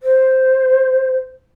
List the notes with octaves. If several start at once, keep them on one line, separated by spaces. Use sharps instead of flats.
C5